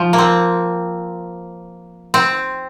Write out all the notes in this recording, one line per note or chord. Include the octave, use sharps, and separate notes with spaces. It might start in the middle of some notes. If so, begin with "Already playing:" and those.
Already playing: F3
A#3
C4
C4